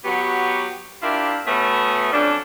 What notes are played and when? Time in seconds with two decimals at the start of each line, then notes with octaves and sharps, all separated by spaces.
0.04 F#3 B3 F#4 G4
1.02 D4 E4 F4 G4 A#4 E5
1.47 B2 A3 B3 C#4 B4 E5
2.12 F2 F#3 C#4 D4